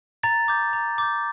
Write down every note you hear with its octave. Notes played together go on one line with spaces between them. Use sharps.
A#5 A6
D6 G6
A#5
D6 G6